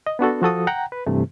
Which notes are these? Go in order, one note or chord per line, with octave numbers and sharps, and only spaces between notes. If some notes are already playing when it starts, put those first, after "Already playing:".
D#5
B3 D4 F#4 A4
F3 F#4 A4 D#6
F#5 G5 A#5
B4
G2 C3 E3 A3